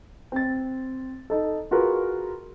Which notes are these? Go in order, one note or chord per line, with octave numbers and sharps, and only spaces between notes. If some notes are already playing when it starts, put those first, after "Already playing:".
C4 A6
D#4 A4
F4 F#4 G#4 A#4 B4